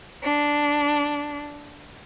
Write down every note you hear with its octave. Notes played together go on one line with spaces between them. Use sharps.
D4